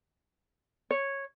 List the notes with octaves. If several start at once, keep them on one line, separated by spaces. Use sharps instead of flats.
C#5